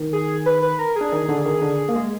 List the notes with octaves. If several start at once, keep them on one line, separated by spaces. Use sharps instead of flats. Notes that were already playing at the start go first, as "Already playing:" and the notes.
Already playing: D#3 D#4
G#4
B4
B4
A#4
G#4
D4
D#3 D#4
D3 D4
D#3 D#4
D3 D4
A#3
G#3